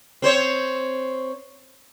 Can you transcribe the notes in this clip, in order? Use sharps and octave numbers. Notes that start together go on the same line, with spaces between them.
C4 C5 C#5